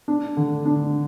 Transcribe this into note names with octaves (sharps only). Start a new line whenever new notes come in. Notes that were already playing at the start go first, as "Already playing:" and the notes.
D4
D3
D4